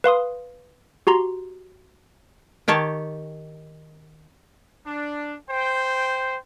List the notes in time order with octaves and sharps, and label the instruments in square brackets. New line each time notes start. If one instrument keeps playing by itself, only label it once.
[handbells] B4 F5 C6 D#6
F#4 G4 A#5 C6
[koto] D#3 G4 C#5 A5
[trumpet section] D4
C5 G5